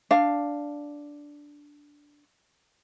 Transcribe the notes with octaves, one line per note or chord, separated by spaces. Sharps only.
D4 F5